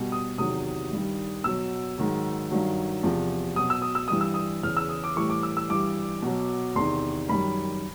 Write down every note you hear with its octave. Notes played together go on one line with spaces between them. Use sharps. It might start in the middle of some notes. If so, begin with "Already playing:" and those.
Already playing: B2 G3
D#6
E2 C3 D#3 F#3 D#6
G2 D#3 G3
B2 F#3 E6
G#2 D#3 F#3
G2 D#3 F#3
E2 C3 F3
B2 F#3 D#6
E6
D#6
E6
G2 E3 G3 D#6
E6
D#6
E2 C#3 E3 F6
E6
D#6
D6
A2 E3 G3 C#6
D6
E6
E6
G2 E3 G3 D6
B2 F#3
E2 C3 D#3 C6
F#2 D#3 G3 B5